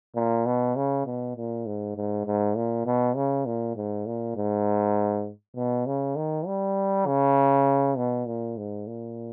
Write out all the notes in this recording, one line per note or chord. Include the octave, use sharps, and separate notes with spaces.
A#2
B2
C#3
B2
A#2
G#2
G#2
G#2
A#2
B2
C#3
A#2
G#2
A#2
G#2
B2
C#3
D#3
G3
C#3
B2
A#2
G#2
A#2